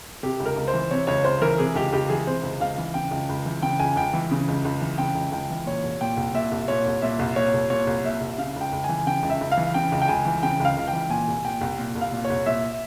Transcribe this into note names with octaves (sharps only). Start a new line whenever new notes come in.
C3 G4
C#2
A#4
C#2
C5
E3
C3 C#5
C#2 C#5
C#2 C5
E3 A#4
C3 G#4
C#2 G4
C#2 G4
E3 G#4
C3 C5
C#2
C#2 F5
E3
C#3 G5
C#2
C#2
E3
C#3 G5
C#2 G#5
C#2 G5
E3
C#3
C#2
C#2
E3
C#3 G5
C#2
C#2 G5
E3
A#2 C#5
C2
A#2 G5
C2
A#2 E5
C2
A#2 C#5
C2
A#2 E5
C2
A#2 C#5
C2
A#2 C#5
C2
A#2 E5
C2
C#3 F5
C#2 G5
C#2
G#5
E3
C#3 G5
C#2
E5
C#2
F5
E3
C#3 G5
C#2
G5
C#2 G#5
E3
C#3 G5
C#2 F5
C#2
G5
E3
A#2 G#5
C2
A#2 G5
C2
A#2
C2
F5
A#2
C#5
C2
A#2 E5